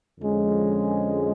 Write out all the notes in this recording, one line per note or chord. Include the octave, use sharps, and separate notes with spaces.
F2 D3 F3 G#3 C#4